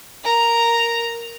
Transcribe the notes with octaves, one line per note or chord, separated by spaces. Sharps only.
A#4 A#5